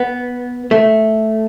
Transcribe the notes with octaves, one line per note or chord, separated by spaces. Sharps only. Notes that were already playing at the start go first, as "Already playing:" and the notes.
Already playing: B3
A3